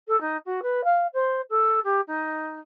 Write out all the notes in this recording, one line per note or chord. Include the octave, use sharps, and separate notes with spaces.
A4
D#4
F#4
B4
F5
C5
A4
G4
D#4